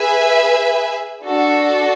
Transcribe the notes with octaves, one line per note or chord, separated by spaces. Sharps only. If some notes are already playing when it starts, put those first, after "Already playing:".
Already playing: G#4 B4 E5 G#5
D4 F#4 A4